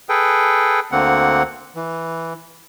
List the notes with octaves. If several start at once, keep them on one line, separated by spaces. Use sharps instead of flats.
G#4 A4 B4 G5
D2 D3 A#3 C4 F#5
E3